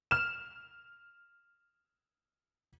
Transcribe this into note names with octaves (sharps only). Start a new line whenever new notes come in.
F6 E7